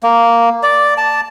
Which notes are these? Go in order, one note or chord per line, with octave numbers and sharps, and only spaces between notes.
A#3
D5
A5